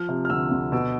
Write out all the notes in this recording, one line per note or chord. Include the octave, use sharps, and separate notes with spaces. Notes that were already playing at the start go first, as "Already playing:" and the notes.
Already playing: F3 F6
C3
F6
D2 E6
D2
B2 E6